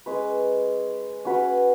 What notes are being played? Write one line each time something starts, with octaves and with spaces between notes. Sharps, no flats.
G#3 C#4 B4
C#4 F#4 B4